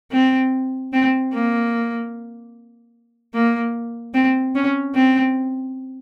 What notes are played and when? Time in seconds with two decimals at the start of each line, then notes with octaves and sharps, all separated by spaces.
0.11 C4
0.92 C4
1.33 A#3
3.34 A#3
4.14 C4
4.55 C#4
4.95 C4